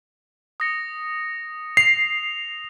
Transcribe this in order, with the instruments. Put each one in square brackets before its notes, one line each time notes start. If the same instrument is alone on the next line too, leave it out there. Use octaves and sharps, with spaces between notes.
[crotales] D#6 A#6 C#7
[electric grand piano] C7 [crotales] F7